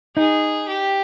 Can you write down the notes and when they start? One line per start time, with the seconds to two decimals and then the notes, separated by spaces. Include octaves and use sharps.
0.17 D#4 G#4
0.68 G4